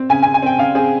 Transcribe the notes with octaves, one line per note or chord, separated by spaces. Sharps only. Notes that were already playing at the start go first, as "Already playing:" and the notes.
Already playing: C4
C#3 G#5
G#5
C#3
G#5
C4 G5
C#3 F5
C4 G#4